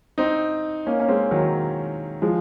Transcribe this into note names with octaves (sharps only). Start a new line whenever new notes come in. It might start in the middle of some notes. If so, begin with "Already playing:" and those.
C4 D#4
A#3 C#4
C#4
G#3 C4
D#3 F#3
F3 G#3